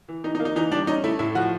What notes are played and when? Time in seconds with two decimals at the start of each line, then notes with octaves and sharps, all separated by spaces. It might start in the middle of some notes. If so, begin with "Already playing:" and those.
0.09 E3
0.24 E3 D#4
0.35 D#4
0.40 A#3
0.45 D#4
0.56 E3 D#4
0.71 G3 D4
0.87 C#4 D#4
1.04 A3 E4
1.19 A2 E4
1.35 F3 F#4